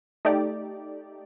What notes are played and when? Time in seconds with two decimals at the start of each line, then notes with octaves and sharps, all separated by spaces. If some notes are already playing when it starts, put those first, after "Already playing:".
0.25 A3 D#4 G4 D5